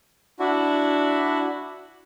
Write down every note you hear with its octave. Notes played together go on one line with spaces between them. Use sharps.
D4 E4 F#4